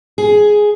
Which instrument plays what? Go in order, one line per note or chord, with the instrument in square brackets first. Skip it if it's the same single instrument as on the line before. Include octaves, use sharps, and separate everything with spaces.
[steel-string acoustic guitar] G#4